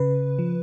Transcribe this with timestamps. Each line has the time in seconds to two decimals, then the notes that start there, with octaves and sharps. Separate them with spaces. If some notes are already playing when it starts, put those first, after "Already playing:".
Already playing: C#3 B4
0.39 F3